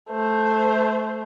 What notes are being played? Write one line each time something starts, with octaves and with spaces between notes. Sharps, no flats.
A3 C5